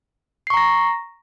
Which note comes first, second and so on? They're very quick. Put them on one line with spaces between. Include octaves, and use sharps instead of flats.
C7 C#6 A#5 A#6